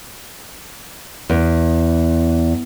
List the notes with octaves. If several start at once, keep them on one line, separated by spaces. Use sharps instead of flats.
E2